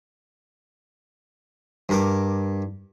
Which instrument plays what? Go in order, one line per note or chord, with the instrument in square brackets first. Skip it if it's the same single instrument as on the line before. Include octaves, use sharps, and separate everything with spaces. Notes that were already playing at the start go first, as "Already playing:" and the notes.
[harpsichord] G2 A#4 D6